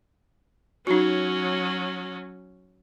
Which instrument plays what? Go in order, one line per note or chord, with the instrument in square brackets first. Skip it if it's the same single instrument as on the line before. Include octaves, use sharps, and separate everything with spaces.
[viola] F#3 C#4 [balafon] D#4 F#4